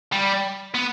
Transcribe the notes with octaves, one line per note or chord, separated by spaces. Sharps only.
G3
B3